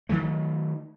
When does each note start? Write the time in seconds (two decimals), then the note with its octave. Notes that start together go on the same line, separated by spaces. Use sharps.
0.09 D#3 E3 F#3 A3